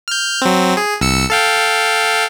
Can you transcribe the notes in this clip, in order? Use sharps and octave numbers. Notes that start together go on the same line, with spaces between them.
F6 G6
F#3 C4
G#4
C2 E6 C#7
A4 F5 G5